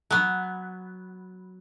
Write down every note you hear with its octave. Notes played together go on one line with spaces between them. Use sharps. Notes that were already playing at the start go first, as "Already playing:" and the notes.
F#3 B3